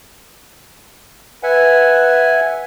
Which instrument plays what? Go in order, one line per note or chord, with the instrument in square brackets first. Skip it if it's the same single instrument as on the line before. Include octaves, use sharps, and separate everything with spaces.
[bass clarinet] B4 [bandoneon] E5 F#5 G#5